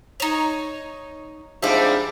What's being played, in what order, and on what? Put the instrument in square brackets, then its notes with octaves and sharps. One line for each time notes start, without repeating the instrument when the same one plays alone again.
[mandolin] D#4 C#5
[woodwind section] G#2 F3 [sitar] G3 C4 D4 [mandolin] E5 D6